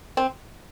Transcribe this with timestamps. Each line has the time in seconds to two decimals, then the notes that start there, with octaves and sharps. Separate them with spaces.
0.17 C4